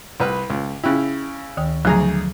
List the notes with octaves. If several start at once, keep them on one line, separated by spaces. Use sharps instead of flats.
C2 B4 F#5 F6
C#2
C#3 E4 G5 F#6
D2 D#3 G5
D2 C#3 F3 F#3 G#4 A#5